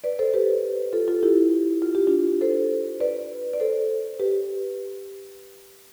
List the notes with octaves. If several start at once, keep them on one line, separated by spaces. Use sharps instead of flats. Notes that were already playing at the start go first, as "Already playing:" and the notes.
B4 D5
A4 C5
G4 B4
F4 A4
F4 A4
E4 G4
F4
G4
D4 F4
A4 C5
B4 D5
D5
A4 C5
G4 B4